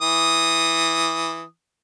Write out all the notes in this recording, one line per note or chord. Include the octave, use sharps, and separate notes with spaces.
E3 D#6